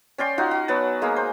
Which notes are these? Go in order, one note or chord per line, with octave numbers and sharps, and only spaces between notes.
C#4 D5 G5 C6
D#4 F4 F#4
F#4
F#3 B3 A5
G#3 A#3 G#4
C5